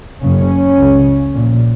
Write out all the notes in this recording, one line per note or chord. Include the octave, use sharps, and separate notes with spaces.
F#1 F#2 C#3 C#4
C#2 C#3
A#1 A#2